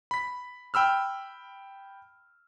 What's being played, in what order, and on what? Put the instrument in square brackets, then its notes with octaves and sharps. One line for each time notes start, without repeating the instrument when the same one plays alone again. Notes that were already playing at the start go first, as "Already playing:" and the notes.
[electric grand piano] B5 B6
G5 B5 E6 F6